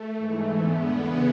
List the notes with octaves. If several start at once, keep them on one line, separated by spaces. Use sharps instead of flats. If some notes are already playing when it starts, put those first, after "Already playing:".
Already playing: A3
G#2 E3
E2 D3 B3
E2 C#3 E3 B3